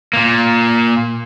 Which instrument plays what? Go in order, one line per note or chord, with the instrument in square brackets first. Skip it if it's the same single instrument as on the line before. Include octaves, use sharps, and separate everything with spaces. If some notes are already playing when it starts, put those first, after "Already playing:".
[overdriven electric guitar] A#2 A#3